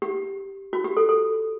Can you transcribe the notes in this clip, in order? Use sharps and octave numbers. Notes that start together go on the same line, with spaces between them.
G4
F#4
G4
A4
A4